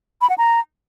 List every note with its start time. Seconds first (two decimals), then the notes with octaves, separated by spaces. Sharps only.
0.21 B5
0.30 F#5
0.38 A#5